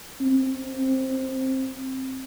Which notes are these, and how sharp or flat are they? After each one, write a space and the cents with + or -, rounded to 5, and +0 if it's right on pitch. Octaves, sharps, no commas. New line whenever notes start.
C4 +10